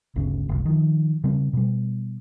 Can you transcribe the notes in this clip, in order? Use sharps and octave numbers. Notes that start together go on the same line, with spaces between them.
G1 D2 C#3
F#1 C2
D#3 F3
C#3 G3 C4
B2 G3